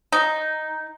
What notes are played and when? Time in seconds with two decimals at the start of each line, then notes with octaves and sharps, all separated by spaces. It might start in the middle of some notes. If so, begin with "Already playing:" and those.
0.12 D#4